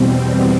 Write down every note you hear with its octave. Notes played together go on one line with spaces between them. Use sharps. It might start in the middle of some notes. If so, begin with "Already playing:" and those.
Already playing: E2 B2 G3 C4